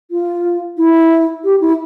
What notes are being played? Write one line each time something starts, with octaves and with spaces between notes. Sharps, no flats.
F4
E4
G4
E4